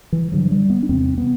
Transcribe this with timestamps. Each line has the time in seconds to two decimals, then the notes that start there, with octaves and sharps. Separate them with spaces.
0.13 E3
0.32 G2 D3 F#3
0.51 G3
0.70 B3
0.83 D4
0.89 E2 C3 C4
1.18 B3